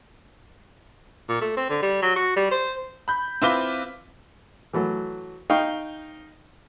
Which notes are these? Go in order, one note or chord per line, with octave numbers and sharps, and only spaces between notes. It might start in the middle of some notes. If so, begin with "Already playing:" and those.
A#2
A3
C4
D3
G3
F#3
F#4
G3
C5
B5 G6
C4 E4 F4 B4 D6 G7
E3 F#3 A3
D#4 F5 G5 C#6